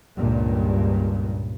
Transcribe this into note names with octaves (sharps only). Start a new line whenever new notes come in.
C#2 G2 A#2